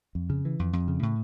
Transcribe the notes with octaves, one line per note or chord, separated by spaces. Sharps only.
F2
C#3
E3
F2
F2
C#3
A2